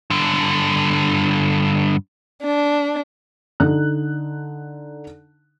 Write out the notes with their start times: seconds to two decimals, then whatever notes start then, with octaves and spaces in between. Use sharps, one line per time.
0.10 G2 D3
2.42 D4
3.60 D3 D#4 F#6